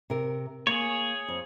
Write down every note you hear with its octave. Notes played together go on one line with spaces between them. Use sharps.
C3 A#4
A#3 G#4 C#5
F2